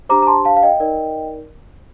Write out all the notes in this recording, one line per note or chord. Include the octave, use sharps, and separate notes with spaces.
D4 G4 C5 A#5 D6
A#5
A5 C6
F5 A5
F5
D#5 G5
D#4 A#4 D5